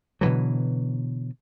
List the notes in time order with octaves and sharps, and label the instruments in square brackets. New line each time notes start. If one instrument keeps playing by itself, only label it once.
[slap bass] B2 D3 E3 F#3